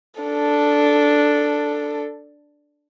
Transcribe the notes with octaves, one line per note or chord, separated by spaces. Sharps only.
D4 A4